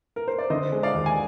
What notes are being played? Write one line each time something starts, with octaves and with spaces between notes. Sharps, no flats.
A#4
C5
D5
D3 C5 D#5
G#3
D5 F5
D#2
G#5